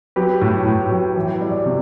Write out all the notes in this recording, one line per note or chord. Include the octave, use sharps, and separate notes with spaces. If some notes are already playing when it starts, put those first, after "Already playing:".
F#3 G4 B4
A2
A2
F#3
E3
G3
C3